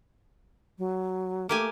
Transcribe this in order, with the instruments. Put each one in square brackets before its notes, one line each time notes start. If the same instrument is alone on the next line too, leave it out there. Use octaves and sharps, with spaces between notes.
[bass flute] F#3
[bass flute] A3 [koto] A#3 G4 G#5